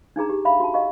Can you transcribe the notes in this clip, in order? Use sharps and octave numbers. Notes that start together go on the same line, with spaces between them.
D4 D#4 G#4 A#5
G4
E5 F5 B5
F#4 A5
D#5 F5 C#6